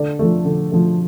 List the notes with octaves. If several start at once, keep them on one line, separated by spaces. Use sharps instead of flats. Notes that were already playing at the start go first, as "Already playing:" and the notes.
Already playing: D3 D5
F3 A3
D3
F3 A3